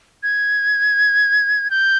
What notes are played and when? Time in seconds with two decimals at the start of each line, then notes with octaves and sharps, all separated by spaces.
0.23 G#6
1.71 G6